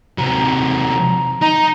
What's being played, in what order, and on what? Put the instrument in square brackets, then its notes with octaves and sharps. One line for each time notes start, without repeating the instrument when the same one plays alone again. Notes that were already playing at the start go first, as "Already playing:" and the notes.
[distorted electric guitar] C3 F#3 [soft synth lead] A#5
[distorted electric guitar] D#4 [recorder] A#5